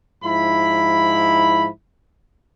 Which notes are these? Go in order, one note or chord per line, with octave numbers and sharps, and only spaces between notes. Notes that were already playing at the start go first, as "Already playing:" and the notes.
G#2 F3 E4 B5